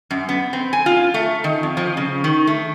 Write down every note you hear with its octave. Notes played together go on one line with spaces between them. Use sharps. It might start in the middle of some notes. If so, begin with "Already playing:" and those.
F#2
B3
C4
G#5
F4
A3
D#3
F2
F3
C#3
D#3
A3